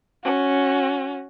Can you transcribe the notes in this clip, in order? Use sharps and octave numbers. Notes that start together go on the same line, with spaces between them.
C#4 F#4